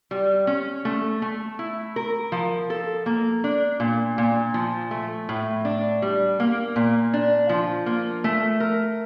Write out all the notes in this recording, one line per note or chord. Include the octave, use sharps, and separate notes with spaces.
G3
C#4
A3
A3
E4
A#4
F3
A4
A#3
D4
A#2
A#2
F3
A3
A2
D4
G3
A#3
A#2
D4
F3
A#3
A3
A#4